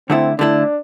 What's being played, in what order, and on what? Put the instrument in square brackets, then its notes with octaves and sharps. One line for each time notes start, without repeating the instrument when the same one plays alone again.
[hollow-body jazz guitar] D3 A3 E4 [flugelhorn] C4
[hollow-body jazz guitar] D3 A3 E4 [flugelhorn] D4